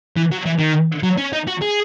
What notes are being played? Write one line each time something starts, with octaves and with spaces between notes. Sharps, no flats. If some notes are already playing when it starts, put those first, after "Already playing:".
E3
F#3
E3
D#3
F#3
C#4
D#4
F#4
G#4